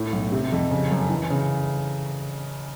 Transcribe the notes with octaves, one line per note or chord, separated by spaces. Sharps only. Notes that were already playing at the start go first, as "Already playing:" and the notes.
Already playing: A2
B1
C3
F2
C#3
F#2
E3
C#3